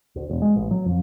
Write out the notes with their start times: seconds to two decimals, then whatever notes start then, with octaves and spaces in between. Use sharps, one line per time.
0.16 D2
0.29 E1
0.42 G#3
0.56 A1
0.71 F#3
0.86 F2